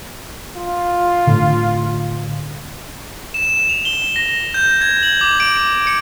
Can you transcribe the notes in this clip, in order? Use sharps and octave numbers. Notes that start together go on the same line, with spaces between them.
F4
A2 D3
E7
F7
G7
A#6
G6
G#6
F#7
D6
D7
C#7